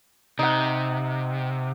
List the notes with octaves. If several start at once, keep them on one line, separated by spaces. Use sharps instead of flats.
C3 D#4 F#5